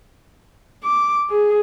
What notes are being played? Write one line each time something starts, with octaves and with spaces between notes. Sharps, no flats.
D6
G#4